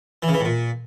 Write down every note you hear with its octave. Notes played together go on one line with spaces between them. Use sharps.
E3
C#3
E3
A2
A#2